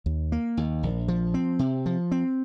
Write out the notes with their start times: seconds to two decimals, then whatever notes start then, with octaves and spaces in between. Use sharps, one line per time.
0.06 D#2
0.32 A#3
0.57 D#2
0.83 A#1
1.08 F3
1.34 C4
1.59 C3
1.86 F3
2.12 C4